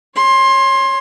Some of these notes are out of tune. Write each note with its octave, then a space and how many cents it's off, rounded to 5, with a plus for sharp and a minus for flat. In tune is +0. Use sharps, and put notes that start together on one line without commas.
C#5 +0 C6 +20